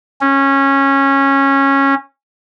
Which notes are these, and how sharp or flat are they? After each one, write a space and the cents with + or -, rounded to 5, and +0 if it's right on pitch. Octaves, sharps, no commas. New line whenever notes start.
C#4 -15